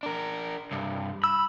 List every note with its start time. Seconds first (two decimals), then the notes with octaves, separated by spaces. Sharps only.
0.03 D4 A#4
0.71 C2 G2
1.24 B5 E6